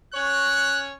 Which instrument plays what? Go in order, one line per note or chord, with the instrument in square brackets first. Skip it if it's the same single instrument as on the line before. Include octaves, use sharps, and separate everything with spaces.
[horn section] C#4 C#5 [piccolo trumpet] F#6